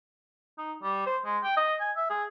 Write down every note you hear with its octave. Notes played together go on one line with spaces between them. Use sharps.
D#4
G3
C5
G#3
G5
D#5
G#5
E5
G#4